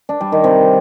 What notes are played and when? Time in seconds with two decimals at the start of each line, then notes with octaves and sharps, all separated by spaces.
0.09 D4
0.21 G3
0.32 D#3
0.44 C3